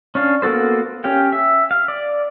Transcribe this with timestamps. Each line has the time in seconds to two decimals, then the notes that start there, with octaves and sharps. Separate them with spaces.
0.15 C#4 D4 F5
0.42 A#3 B3 F#4 A4 C5
1.04 C#4 G4 F5 G5
1.32 E5
1.71 F5
1.88 D5